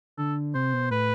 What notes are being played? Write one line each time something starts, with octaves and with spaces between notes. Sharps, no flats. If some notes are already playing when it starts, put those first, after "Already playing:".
D3 A4
C3 C5
B2
A2 B4